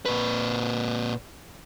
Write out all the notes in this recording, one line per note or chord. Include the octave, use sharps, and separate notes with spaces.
A#2 B4